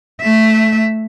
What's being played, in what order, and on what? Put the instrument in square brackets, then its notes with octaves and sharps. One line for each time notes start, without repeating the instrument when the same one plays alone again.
[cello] A3 E5